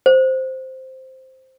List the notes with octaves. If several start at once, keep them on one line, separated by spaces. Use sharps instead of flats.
C5